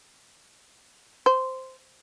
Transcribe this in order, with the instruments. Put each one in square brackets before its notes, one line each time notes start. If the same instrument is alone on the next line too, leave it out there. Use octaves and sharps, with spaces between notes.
[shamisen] C5